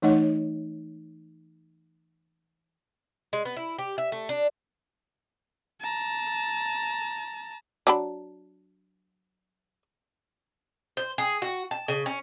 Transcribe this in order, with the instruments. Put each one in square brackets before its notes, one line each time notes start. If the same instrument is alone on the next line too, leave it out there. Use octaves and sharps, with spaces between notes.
[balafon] E3 A3 D#4 C#5 D#5 F#5
[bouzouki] G#3
B3
E4
G4
E5
A3
D4
[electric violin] A5 A#5
[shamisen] F#3 D4 B5
[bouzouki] C5
G#4
F#4
A5
C#3
C#4